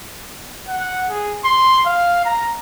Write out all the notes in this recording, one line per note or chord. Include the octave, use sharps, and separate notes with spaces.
F#5
G#4
C6
F5
A#5